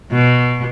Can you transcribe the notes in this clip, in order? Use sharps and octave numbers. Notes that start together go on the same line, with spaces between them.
B2